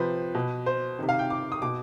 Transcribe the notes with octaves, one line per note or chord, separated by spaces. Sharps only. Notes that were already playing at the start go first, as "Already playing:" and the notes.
Already playing: C3 F3 B4 C5
B2
C5
C3 D#3
F5
G5
D6
D#6
B2 D6